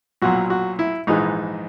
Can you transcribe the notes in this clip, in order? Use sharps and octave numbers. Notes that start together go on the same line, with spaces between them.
B1 A#2 F#3 F#4
F#4
E4
A#1 G#2 E3 G#3 D#4